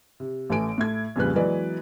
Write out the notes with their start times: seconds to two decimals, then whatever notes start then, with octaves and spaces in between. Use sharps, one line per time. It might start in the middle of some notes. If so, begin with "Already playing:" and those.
0.20 C3
0.50 A1 A3 B4 G#5 D7
0.78 A2 A3 G#6
1.16 F2 A#2 C#3 G3 B4 F#6
1.35 E3 F#3 G#3 B3 B4 D5